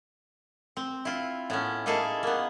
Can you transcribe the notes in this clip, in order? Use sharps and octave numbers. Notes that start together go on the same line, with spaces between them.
C4
E4 F4
A2 B3 C#4
A#3 D#4 E4 G#4 A4
A#3 B3